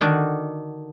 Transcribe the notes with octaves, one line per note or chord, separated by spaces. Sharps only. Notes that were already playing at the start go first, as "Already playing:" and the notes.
D3 D#3 D4 F#4 D5